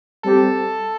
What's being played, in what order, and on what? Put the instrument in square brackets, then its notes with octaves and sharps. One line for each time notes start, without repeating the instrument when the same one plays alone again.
[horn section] G3 C4 G4 [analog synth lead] A4